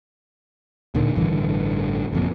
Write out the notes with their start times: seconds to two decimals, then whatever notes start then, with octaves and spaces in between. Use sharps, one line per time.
0.95 D1 A#2 D3 D#3
1.16 A1 G2 D3 E3
2.13 F#1 F2 A#2